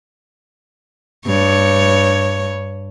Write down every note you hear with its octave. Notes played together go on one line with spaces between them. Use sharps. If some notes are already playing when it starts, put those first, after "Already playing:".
G2 C#5